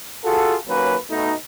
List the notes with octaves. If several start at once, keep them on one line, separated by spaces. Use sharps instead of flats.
F4 F#4 G#4 A4
D#2 F#3 A#3 C#4 B4
B2 A3 D#4